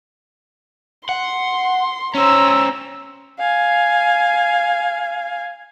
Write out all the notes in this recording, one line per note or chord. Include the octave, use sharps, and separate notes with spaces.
F#5 C6
C#4 C5 A#5 E6
F5 G#5